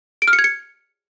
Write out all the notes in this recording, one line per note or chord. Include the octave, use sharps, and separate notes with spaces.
D7
F6
C#7
G#6
C#7